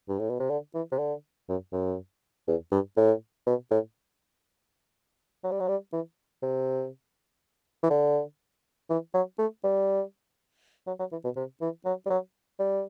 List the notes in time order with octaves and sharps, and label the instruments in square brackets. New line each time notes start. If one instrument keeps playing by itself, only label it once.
[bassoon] G2
A2
B2
C3
D3
E3
C3
D3
F#2
F#2
E2
G2
A2
B2
A2
F#3
G3
F#3
G3
E3
C3
E3
D3
E3
F#3
A3
G3
F#3
F#3
E3
B2
C3
E3
F#3
G3
F#3
G3